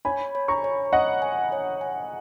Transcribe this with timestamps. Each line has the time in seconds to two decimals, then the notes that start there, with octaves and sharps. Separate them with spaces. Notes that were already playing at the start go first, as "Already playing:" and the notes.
0.05 C#5 G#5 B5
0.35 C#5
0.48 A#5 C#6
0.64 C#5
0.93 C#5 D#5 F#5
1.22 G#5
1.52 C#5
1.81 G#5